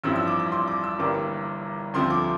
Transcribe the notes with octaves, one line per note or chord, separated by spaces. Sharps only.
A1 G2 F3 C4 E4 E6
E6
D6
D6
C6
D6
E6
G1 G2 E3 G3 A#3 D6
D2 D3 F3 C4 C6
D6